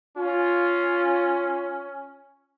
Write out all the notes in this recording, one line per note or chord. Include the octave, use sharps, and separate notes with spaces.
C#4 F4